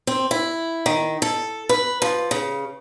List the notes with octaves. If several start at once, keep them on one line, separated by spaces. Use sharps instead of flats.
C4
E4
D#3
A4
B4
F3
C#3